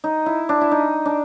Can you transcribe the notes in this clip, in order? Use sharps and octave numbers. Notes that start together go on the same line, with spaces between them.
D#4
E4
D4
E4
D#4
D4